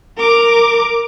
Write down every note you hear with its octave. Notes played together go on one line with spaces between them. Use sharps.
A#4 D6